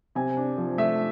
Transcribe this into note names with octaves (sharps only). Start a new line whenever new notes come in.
C3 G#5
D4
F3
A3 E5